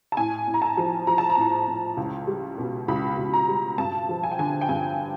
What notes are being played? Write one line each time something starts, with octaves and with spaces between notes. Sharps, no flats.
A5
A2 G#5
A2
A#5
A5
F3
F3 A#5
A5
A#5
A2
A2
C#2
G3
B2
C#2 B5
C#2
A#5
G3
G2 A5
F3
G#5
G5
D3 G#5
G5
G2 G#5